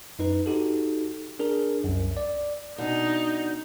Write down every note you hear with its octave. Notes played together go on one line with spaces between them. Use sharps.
F#2 D#4 B4
D#4 F#4 G4 A4
D4 G#4 A#4
C2 F#2
D5
B2 D4 D#4